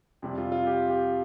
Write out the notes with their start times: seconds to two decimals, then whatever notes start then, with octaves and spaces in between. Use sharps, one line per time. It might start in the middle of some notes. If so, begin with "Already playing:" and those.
0.22 F2 C3 G3
0.38 F4
0.52 F4
0.67 G4
0.89 G4